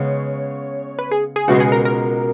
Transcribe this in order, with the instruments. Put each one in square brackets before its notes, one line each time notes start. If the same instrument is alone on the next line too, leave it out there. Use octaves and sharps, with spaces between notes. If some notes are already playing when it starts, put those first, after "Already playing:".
Already playing: [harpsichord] C#3 G#3 B3 [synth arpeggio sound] C#5
[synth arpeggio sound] B4
G#4
G#4
[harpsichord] C#2 B2 G#3 [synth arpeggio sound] F#4
[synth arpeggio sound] G#4
A#4
A#4